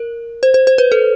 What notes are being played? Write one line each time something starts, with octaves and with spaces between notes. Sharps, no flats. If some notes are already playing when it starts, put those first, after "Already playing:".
Already playing: A#4
C5
C5
C5
B4
A4